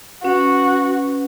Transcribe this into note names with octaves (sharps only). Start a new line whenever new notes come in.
C#4 F#4 B4